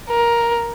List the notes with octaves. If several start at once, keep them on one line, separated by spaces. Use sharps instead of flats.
A#4